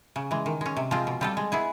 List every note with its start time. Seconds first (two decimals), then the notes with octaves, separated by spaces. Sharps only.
0.16 C#3
0.31 E3 G#3
0.46 D#3
0.61 G#3 C#4
0.77 C3
0.91 F3 G#3 C4 F4
1.07 B2
1.21 G3 C4 F4 A4
1.37 G#3
1.52 B3 E4 G#4